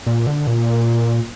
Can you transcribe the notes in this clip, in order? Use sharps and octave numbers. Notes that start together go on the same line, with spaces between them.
A#2
D3
A#2